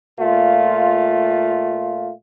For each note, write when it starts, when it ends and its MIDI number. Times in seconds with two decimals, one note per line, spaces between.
0.20 2.11 46
0.20 2.11 57
0.20 2.11 65